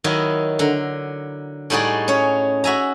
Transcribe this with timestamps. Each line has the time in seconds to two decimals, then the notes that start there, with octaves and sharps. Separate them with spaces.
0.04 D#3 F#3 E4 D#5
0.59 D3 A#5
1.70 A2 G3 D#4 F#4 G#4 D5
2.08 C#4 C#5
2.64 F#4 E5 G#5 A#5